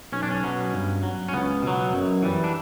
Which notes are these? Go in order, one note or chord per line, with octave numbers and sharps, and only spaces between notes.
B1 C#4
D4
C#4
B2 F#3
G2
F#3
C#4
C#2 B3
B2
F#3
F#2
E3 G3
D4